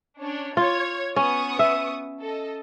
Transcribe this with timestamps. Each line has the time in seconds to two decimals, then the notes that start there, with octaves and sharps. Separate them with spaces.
0.21 C#4 D4 C#5
0.57 F4 C#5 G#6
1.16 B3 C#4 C#6 D#6
1.59 E5
2.21 A4 D#5